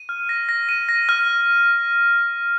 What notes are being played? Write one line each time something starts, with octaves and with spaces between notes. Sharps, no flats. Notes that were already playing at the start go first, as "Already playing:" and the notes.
Already playing: D#7
F6
A#6
A#6
D#7
A#6
F6